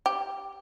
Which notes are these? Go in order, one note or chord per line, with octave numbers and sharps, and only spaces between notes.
G4